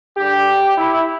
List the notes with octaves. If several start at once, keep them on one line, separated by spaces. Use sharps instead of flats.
G2 D3 G3 G4
E4